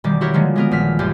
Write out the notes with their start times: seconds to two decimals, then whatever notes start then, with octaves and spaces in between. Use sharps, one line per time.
0.04 E1 D#3 G3 D6
0.21 E4 F#4 G4 A#4 C#5
0.34 D3 D#3 F3 G#3 A#3
0.56 G#3 B3 A#4
0.71 A#1 F6 B6
0.99 D#1 F#2 G4